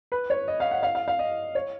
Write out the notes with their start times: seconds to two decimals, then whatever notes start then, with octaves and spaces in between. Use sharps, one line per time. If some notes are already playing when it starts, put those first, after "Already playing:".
0.12 B4
0.30 C#5
0.48 D#5
0.60 F5
0.71 F#5
0.83 F5
0.95 F5
1.08 F5
1.19 D#5
1.55 C#5